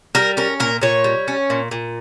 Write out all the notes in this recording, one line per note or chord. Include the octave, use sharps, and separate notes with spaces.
G3 A#4
C#4 A#4
A#2 A#4
A#2 C#5
G3
C#4
A#2
A#2